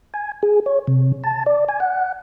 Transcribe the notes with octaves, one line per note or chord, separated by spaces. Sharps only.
G#5
G#4
C#5
C3
A5
D5
G#5
F#5